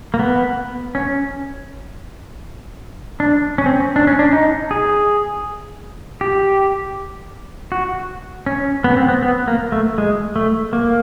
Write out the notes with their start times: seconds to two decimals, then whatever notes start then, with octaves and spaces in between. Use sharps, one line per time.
0.14 A#3
0.19 B3
0.95 C#4
3.20 D4
3.58 C#4
3.66 C4
3.74 C#4
3.96 D4
4.07 C#4
4.19 D4
4.33 D#4
4.71 G#4
6.21 G4
7.72 F#4
8.46 C#4
8.84 B3
8.97 C4
9.08 B3
9.22 B3
9.48 A#3
9.72 A3
9.98 G#3
10.36 A3
10.73 A#3